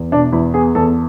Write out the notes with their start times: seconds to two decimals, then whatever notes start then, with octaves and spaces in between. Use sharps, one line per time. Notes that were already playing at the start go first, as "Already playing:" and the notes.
Already playing: E2
0.12 B2 D4
0.32 E2 E4
0.54 B3 G#4
0.75 E2 A4